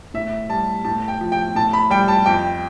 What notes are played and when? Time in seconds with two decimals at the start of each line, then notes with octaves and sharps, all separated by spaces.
0.14 A2 E5
0.49 G3 A5
0.85 A2 A5
1.08 G5
1.21 F3
1.32 G5
1.55 A2 A5
1.73 B5
1.91 G3 G5
2.08 A5
2.26 F2 G5